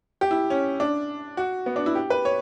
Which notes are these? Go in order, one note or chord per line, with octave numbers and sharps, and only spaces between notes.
G4
E4
C#4
D4
F#4
B3
D4
E4
G4
B4
C#5